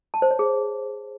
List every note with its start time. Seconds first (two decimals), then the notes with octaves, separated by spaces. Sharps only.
0.14 A5
0.22 C5
0.31 C#5
0.39 G#4